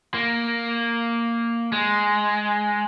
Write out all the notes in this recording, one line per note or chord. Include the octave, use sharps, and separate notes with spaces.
A#3
G#3